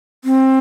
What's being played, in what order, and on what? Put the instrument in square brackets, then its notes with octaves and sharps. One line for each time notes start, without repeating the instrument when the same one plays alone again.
[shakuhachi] C4